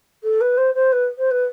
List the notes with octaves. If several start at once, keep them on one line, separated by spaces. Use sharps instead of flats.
A4
B4
C5
C5
B4
C5
B4